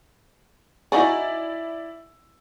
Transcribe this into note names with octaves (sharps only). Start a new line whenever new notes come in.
D#4 E4 F#4 G#4 D5